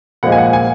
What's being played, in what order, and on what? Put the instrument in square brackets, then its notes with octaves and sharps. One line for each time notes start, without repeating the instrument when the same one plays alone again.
[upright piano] A#2 F3 G#3 F#5
G#5
F#5
G#5